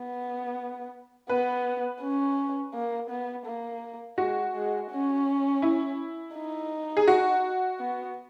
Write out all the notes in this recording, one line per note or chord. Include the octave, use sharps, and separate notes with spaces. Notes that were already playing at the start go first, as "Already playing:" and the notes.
Already playing: B3
B3 B4
C#4
A#3
B3
A#3
G#3 F#4
G#3
C#4
E4
D#4
G#4
F#4
B3